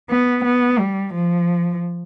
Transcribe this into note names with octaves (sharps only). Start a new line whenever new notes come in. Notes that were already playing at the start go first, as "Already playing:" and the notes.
B3
B3
G3
F3